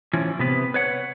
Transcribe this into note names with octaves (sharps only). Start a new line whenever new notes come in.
E3 F3 C#4
C3 B3 B4
B4 C#5 F#5